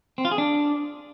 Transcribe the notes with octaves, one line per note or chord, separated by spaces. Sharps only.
C4
F4
G#4
D4